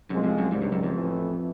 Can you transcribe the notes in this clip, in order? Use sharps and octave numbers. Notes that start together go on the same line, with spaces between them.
C2 F#2 C3 F3 G#3 C4
F2
F#2
C#2 G#2 C3 D#3 G3
G2
F#2
F2
A1 A2 E3 A3